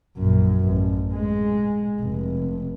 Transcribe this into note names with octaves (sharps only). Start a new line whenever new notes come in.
A#1 F#2
A1
G#3
F1